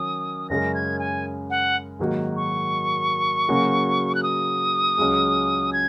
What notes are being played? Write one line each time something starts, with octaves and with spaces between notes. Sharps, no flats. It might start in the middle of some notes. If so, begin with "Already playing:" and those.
Already playing: D#3 F#3 C#4 D#6
F#2 C#3 G#3 C#4 A#4 A#6
G#6
G#5
F#5
G#2 D#3 F#3 A#3 F#4
C#6
C#3 F#3 A#3 C#4 F#4
F#6
D#6
C#2 C#3 F#3 C#4
G#6